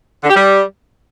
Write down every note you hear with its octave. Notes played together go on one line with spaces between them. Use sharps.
D3
G4
G3